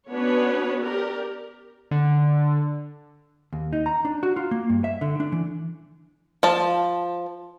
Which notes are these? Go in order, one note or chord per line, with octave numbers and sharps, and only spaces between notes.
B3 C#4 D4 F#4 B4 C#5
G4 A#4 D5
D3
D#2
D#4
A#5
D4
F#4
F4
A#3
G2
E5
D3
D4
E3
F3 A5